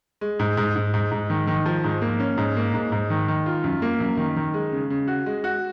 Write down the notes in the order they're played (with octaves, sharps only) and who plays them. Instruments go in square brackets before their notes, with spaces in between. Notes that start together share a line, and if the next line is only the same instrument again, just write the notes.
[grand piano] G#3
G#2
G#2
G#2
G#2
G#2
D#3
D#3
F3
G#2
A#3
C#4
G#2
A#3
G#2
G#2
D#3
D#3
F4
F#2
A#3
F#2
D#3
D#3
G#3
C#3
C#3
F#4
G#3
F#4